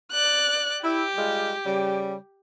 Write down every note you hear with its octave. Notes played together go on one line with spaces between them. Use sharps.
D5 F#6
E4 G4
G3 G#3 F4
C#3 G3